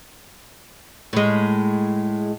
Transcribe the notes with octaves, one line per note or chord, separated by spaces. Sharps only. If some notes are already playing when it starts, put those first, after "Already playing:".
A2 G#3